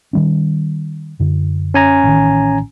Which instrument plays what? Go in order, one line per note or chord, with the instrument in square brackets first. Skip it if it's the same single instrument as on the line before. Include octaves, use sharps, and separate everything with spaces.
[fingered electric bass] D#3 G3 C#4
F#2 D3
[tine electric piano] C#4 G#5 A#5
[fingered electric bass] A1 D#3